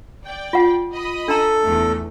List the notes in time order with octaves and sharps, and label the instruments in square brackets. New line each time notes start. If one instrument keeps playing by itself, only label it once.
[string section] D5 G5
[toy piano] F4 F#5
[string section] D#5 B5 D#6
[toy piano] D4 A#5 [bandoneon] A4
[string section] E2 A3